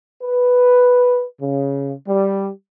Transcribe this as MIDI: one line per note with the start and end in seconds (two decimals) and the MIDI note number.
0.22 1.23 71
1.41 1.92 49
2.07 2.49 55